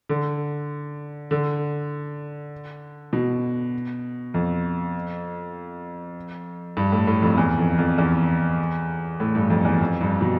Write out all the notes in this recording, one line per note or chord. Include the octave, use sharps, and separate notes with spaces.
D3
D3
B2
F2
G2
A2
A2
F2
E2
F2
F2
E2
A2
G2
F2
E2
F2
G2
B2